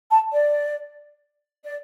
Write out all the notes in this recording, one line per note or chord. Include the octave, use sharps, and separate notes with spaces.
A5
D5
D5